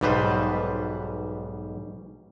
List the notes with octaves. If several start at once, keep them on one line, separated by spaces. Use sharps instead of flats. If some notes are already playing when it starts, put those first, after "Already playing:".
B1 G#2 B2 G3 B4 C5